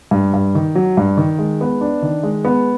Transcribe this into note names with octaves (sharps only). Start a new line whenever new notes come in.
G2
G2
D#3
F#3
G2
D#3
G#3
B3
D4
D#3
G#3
B3